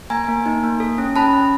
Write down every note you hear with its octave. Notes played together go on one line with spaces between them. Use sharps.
A#3 G#5 A#5
A#3
D#4
A#3
A4
C#4
C#4 A5 B5
C#4